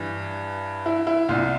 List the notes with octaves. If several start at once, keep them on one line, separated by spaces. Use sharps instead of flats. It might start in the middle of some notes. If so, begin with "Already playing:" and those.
Already playing: G2 E3
E4
E4
C2 A#2 F4